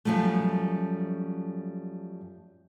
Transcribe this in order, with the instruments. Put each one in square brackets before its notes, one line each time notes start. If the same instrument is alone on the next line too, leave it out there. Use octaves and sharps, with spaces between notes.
[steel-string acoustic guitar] F#2 B2 F3 G3 A3